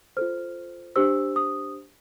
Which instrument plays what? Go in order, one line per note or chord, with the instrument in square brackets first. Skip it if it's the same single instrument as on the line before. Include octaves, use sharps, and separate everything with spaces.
[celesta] F4 A4 C5 F6
D4 G4 C5 E6
D#6